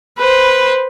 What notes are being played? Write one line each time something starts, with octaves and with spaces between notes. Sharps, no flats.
B4 C5